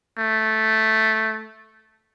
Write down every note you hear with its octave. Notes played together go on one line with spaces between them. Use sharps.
A3